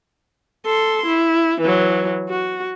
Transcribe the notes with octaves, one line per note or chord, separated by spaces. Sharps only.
A4 C6
E4
E3 F#3
F#4